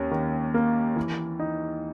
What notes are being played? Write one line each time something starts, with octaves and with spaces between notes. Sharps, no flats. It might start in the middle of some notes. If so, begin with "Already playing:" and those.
Already playing: D#2 C#4
D#3
A#3
E3
D#4